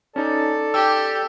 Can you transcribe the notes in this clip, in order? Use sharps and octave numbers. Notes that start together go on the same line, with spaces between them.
C#4 D#4 A4 D5 A5
G4 G5 E6